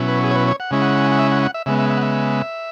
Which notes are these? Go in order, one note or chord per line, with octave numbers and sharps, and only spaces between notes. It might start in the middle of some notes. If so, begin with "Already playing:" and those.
Already playing: B2 F#3 C#4 E4
B4
G#4
C#5
B4
C#5
F#5
C#3 G#3 C#4 E4
F#5
F#5
E5
F#5
F#5
E5
C#3 G#3 B3 E5
E5
E5
F#5
E5